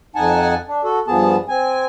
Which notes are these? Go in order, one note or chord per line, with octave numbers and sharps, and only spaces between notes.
F2 D#4 F#5 G#5 A5
D4
F#4 A4
G2 F3 B3 G#4 A5
C4 G#5